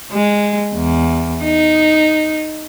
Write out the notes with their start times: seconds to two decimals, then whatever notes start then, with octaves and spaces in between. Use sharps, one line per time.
0.12 G#3
0.76 E2
1.44 D#4